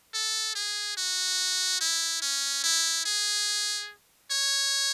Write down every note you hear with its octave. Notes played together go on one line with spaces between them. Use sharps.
A4
G#4
F#4
E4
C#4
E4
G#4
C#5